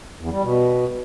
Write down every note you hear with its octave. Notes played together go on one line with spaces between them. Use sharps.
E2
G3
B2